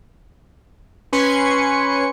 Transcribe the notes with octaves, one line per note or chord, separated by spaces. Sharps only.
C#4 B4 G#5 C6 C#6 C#7